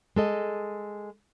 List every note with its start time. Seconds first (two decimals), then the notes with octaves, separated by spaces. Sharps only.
0.16 G#3 A4 D#5